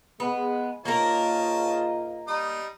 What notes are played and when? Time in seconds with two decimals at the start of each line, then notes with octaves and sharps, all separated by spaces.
0.20 G#3 B3
0.85 G#2 A#3 C#4 F4 A#4 D#5 A5
2.27 G3 D#4 D#6